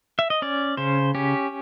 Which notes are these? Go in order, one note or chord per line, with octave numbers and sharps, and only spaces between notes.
E5
D#5
C#4 D5
C#3 C5
C#4 G4